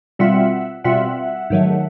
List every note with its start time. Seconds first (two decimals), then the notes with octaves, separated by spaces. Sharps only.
0.19 B2 G3 C4 F4 E5 F#5
0.84 B2 G3 C4 F4 E5 F#5
1.50 G#2 D#3 F#3 A3